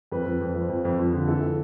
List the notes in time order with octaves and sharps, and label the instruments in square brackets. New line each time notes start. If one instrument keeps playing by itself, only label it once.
[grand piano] F2 B4
F2
F2
F3
F2
F2
F2
D3
E3 A4
E3